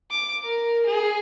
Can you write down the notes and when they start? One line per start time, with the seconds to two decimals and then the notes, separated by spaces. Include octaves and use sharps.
0.11 D6
0.45 A#4
0.87 G#4